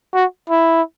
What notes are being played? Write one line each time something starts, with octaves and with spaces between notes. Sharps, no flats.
F#4
E4